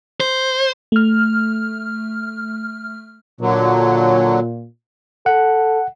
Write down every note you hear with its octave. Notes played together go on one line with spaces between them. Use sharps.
C5
A3 F6
A#2 D3 F#3
A4 F#5